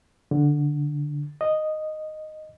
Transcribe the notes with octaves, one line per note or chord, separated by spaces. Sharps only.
D3
D#5